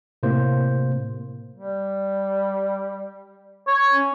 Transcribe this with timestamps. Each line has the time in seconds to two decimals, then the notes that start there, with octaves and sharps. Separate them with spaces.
0.23 A2 C3 A#3 C5
1.56 G3
3.67 C#5
3.92 C#4